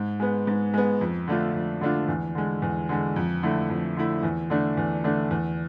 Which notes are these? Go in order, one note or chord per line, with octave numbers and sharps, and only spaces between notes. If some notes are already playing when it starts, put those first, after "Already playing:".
Already playing: G#2
G#3 B3
G#2
G#3 B3
F2
D3 A3 D4 F4
F2
D3 A3 D4 F4
E2
D3 G#3
E2
D3 G#3
F2
D3 A3 E4
F2
D3 A3 E4
E2
D3 A3 D4
E2
D3 A3 D4
E2